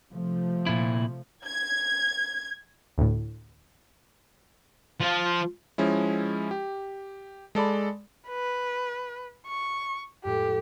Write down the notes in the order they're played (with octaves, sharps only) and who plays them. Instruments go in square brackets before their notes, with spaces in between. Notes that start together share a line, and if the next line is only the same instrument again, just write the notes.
[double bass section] C3 F3 A3
[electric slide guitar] A#2 E4
[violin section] G#6
[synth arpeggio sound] D2 A2
[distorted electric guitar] F3
[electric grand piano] F3 G#3 C#4 E4
G4
G#3 A4 D5 B5
[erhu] B4
C#6
[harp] F2 A2 G#3 [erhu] G4